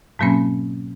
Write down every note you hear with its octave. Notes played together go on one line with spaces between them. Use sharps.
G#2 B2 F#3 A#3 C4 C#4